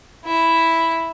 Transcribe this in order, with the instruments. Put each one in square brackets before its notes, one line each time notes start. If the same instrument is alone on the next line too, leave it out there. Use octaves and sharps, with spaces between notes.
[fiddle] E4 E5